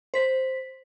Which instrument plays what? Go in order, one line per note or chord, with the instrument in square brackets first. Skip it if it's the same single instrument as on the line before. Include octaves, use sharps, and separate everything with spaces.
[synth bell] C5 B6